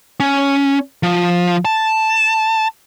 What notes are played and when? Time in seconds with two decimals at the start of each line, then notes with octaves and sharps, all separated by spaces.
0.20 C#4
1.03 F3
1.65 A5